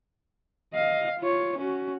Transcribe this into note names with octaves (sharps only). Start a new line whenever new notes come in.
D#5 F5
F4 C#5
C#4 F#4